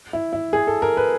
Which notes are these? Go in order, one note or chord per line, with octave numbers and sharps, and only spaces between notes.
E4
E4
G#4
A4
A#4
B4